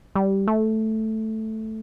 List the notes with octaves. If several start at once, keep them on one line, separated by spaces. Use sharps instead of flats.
G3
A3